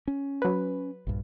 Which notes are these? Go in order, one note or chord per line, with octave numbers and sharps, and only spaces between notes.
C#4
F#3 B4
A#1 G2